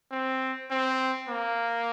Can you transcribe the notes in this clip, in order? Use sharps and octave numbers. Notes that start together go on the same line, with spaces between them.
C4
C4
A#3